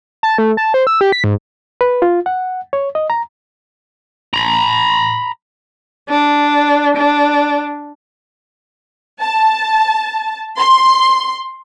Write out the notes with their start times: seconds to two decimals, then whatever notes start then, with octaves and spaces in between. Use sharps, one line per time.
0.23 A5
0.38 A3
0.57 A5
0.74 C5
0.87 E6
1.01 G4
1.12 B6
1.24 G#2
1.81 B4
2.02 F4
2.26 F#5
2.73 C#5
2.95 D#5
3.10 A#5
4.34 A#5 B5
6.09 D4
6.97 D4
9.21 A5
10.59 C6